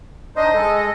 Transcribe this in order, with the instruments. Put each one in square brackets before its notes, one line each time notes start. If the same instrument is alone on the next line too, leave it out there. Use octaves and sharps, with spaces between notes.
[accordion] D4 D#4 C5 [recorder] D#5
[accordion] G#3 A4